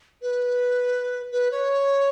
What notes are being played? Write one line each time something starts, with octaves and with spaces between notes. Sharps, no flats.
B4
B4
C#5